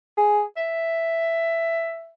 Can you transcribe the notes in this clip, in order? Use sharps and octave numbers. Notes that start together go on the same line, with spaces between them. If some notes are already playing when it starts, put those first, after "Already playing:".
G#4
E5